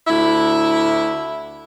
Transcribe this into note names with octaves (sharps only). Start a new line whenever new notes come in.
D2 E4